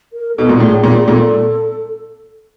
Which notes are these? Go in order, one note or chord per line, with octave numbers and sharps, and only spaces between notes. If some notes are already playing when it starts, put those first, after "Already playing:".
A#4
B2 A4
A#2
A2 G#4
A#2 G#4
G#4
A#2 A4